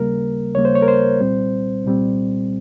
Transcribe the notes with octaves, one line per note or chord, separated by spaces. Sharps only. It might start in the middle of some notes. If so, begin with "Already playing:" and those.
Already playing: D#2 C#3 G3 A#3 A#4
D#2 C#3 G3 A#3 C#5
C5
C#5
A#4
C5
C2 A#2 G3 C4
C2 A#2 G3 C4